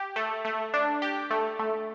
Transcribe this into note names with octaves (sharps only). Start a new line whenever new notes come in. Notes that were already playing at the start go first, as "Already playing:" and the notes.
Already playing: G4
A3
A3
D4
G4
A3
A3